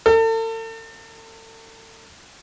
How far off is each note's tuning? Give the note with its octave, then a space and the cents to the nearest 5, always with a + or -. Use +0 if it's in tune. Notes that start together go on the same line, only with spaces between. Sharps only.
A4 +40